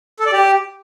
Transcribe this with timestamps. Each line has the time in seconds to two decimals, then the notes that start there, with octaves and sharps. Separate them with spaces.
0.19 A4
0.26 D5
0.32 G4